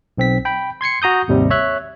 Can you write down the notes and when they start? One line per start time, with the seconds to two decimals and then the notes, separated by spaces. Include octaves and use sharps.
0.18 B1 C4 B6
0.45 G5 B5
0.81 C6 G#6 C7 C#7
1.02 F#4 A#5 D#6 G6
1.28 G#1 D#2 C3 G3
1.50 C#5 E5 F#6